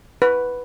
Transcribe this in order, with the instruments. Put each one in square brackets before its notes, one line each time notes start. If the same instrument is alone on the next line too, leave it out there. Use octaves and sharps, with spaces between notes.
[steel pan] B4